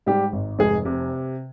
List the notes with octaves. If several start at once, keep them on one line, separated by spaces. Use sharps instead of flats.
G#2 G3 G4
G#1
F1 G#3 G#4
C3